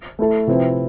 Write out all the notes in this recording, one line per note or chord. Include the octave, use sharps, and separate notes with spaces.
A3 E4 A4
C3 F3 C4 E4 B4